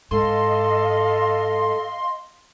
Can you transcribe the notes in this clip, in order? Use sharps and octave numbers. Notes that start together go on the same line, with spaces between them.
G#2 A4 D#5 F5 C6